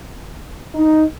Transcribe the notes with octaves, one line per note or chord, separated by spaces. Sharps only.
D#4